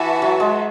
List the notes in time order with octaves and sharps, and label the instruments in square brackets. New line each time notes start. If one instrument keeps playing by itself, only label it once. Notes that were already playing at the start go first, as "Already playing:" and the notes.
Already playing: [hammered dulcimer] E3 [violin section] F#4 B4 E5 A5
[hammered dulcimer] F#3
G#3